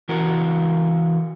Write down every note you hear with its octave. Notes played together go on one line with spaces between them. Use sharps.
E3 F#4 A#4